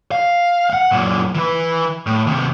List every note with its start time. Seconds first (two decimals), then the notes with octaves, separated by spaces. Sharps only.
0.12 F5
0.70 F5 F#5
0.91 F#2 A#2
1.35 E3 B4
2.06 A2
2.27 D#2 C3